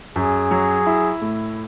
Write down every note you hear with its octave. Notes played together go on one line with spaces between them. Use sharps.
F#2 G#4
F#3
E4
A2